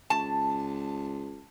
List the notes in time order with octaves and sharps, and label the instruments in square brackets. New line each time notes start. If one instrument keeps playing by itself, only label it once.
[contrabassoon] C#2 [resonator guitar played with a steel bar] A5